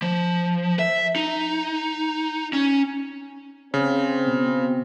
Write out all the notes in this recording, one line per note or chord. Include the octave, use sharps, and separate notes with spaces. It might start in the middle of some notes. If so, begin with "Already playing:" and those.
F3
E5
D#4
C#4
C#3 C4
B2